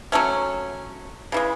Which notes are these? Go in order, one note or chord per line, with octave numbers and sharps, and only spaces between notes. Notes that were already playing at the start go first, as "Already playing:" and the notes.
F#3 A3 C#4
C#3 E3 G#3